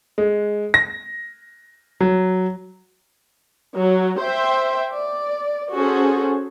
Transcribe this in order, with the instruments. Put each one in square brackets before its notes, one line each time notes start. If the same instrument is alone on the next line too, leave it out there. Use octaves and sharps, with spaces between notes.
[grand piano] G#3
A#6
F#3
[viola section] F#3
C5 E5 G5
D5
C#4 F#4 G#4 A4 C5